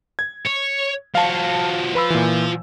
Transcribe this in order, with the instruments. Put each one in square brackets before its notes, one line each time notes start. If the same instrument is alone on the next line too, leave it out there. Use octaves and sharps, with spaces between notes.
[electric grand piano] G#6
[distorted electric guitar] C#5
[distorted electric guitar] F3 F#4 [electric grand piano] F5 A5
[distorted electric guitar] F3 [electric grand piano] B4 B5 E6
[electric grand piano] A#2 E3